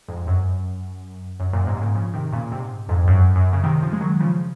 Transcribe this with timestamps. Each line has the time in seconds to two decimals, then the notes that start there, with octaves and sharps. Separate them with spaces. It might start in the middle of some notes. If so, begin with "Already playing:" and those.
0.08 F2 G#2
0.27 F#2
1.40 F#2
1.53 F#2 A#2
1.67 G#2 C3
1.81 A#2 C#3
1.95 C#3 F3
2.14 C3 D#3
2.32 A#2 C#3
2.52 G#2 C3
2.89 F2 G#2
3.07 F#2
3.36 F#2
3.53 C#3
3.63 C3 D#3
3.82 C#3 F3
3.93 G#3
4.01 D#3 F#3
4.21 C#3 F3